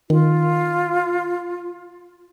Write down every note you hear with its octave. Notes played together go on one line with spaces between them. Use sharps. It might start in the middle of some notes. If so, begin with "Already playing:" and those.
D#3 F4